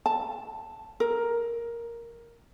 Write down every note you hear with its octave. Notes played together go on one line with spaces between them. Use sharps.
A5
A#4